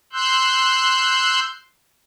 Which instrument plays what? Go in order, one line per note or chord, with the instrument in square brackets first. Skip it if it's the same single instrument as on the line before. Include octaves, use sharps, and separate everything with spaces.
[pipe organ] C6 E6 F#6 G6